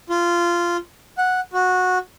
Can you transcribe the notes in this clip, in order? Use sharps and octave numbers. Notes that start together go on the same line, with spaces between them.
F4
F#5
F#4